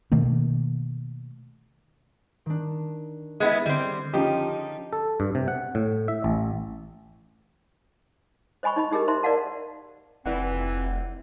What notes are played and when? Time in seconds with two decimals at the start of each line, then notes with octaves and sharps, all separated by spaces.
0.12 B2 D#3 A3 A#3
2.46 D#3 D4
3.40 G#3 B3 E4
3.66 D3 G3 C4 A6
4.13 C#3 F3 D#4 G4
4.93 A4
5.20 G2
5.35 C3
5.48 F#5
5.75 A2
6.08 E5
6.24 A1
8.63 C5 D#5 G#5 B5 C#6
8.76 D#4 D#5 B5
8.91 D#4 G4 G#4 A#4 D#5
9.08 D#4 C5 E5 A#5 C6
9.23 A#4 D5 D#5 F5 F#5 A5
10.26 F1 E3 C4 E4 D5 F#5